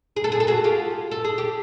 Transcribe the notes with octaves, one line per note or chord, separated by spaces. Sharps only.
G#4
A4
G#4
A4
F#4 G#4
F4 G4
A4
G#4
G4